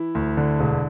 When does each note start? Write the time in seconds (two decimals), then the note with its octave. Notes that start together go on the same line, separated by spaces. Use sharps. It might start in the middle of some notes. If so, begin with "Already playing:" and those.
Already playing: E3 E4
0.15 D2
0.37 D3
0.60 E1